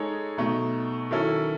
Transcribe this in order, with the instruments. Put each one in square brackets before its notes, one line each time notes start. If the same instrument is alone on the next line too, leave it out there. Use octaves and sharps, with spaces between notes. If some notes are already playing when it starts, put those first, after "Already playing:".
Already playing: [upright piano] G#3 D#4 A4 C#5
B2 F#3 A3 D#4
D#3 F#3 C#4 E4 A4